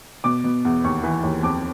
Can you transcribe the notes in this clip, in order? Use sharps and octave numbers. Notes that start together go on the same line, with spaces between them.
B2 D6
B2
E2
D#2 C#6
E3
D#2
F2 D6